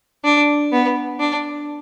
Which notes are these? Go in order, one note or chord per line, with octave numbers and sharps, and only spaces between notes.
D4
B3
D4